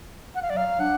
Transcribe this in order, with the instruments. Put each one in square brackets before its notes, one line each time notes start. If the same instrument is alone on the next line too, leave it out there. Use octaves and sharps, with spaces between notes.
[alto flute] F#5
F5
[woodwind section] F#3 [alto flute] D5
[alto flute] F5
[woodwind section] D4 [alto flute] F#5